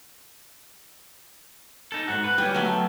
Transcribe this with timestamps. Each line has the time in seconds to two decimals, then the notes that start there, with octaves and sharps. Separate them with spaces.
1.92 D#4 A4
2.08 G#2 F#4
2.24 B4
2.38 G3 C#4 B4 G5
2.54 F#3 A3 B3
2.67 A5